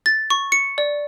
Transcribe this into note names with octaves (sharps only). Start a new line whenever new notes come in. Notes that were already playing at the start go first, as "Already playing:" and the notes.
A6
C#6
C#7
D5